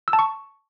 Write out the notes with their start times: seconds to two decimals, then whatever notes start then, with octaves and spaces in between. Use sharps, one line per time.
0.08 E6
0.13 A5
0.19 C#6